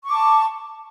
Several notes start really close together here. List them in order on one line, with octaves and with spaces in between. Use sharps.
C#6 D6 A5